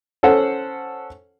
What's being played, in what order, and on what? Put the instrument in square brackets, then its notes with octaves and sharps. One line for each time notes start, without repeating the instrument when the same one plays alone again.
[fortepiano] C#4 A4 C5 F#5